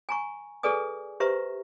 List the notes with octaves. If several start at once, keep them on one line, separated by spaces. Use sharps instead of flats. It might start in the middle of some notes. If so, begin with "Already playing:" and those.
G#5 A#5 C#6
G#4 A4 B4 D5 G#5 D#6
G4 B4 C5 E5 A#5 C#6